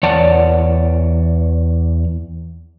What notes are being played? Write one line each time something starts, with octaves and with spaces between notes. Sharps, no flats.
E2 C#5 D5 F#5 A5